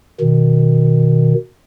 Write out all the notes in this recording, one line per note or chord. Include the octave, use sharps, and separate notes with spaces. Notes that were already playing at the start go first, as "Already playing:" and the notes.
B2 D#3